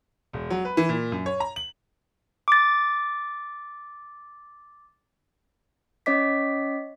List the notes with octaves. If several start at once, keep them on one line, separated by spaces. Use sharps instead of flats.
E1
F#3
B4
E3
A#2
F#2
C#5
A#5
F#7
D6 A6
C#4 C#5 D#5 D6 B6